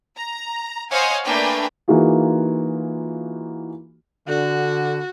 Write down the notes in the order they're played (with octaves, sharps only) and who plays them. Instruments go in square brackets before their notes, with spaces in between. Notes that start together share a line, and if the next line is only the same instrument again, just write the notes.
[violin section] A#5
C5 C#5 D#5 F5 F#5 G#5
A3 A#3 D4 B4 G5 G#5
[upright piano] E3 A#3 D#4 F4 F#4 G#4
[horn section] D3 [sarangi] F#4